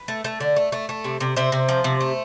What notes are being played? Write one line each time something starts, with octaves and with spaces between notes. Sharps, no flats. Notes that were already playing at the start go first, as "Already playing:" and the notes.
Already playing: B4
A3
A3
D3
A3
A3
A3
C3
C3
C3 C5 E5
C3
F3
C3
A3